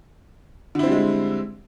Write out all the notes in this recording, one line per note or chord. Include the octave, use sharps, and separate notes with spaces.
D3 G3 G#3 C4 E4